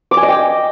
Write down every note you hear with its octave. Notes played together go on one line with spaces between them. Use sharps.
D6
G#5
D#5
G5